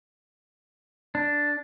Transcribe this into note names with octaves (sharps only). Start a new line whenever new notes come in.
D4